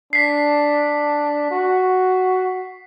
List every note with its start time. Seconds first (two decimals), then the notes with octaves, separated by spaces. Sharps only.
0.13 D4 B6 C7
1.51 F#4